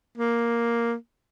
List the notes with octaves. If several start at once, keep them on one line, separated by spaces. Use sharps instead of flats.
A#3